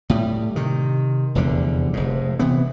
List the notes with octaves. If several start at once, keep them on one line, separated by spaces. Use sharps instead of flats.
A2 G3
C3 D#3
F1 E2 D3 G3
F1 G#2
C3 E3 B3